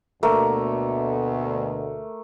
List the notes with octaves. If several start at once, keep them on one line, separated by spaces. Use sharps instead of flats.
D2 B2 A3 A#3